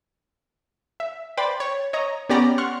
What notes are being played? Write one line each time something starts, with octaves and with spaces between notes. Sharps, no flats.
E5
B4 C5 D5 G5 B5 A6
C#5
C#5 D#5 A#5
B3 C#4 G4 D5 A#5
F#5 C6 C#6 F6